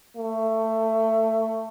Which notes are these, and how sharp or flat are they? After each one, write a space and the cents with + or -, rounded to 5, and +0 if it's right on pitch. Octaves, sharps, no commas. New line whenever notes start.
A3 +20